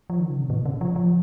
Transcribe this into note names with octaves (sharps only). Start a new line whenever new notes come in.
F3
D#3
C#3
C3
A#2
C#3
F3
F3